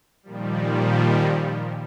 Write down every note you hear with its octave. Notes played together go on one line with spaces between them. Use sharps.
A#2 D#3 F3 G3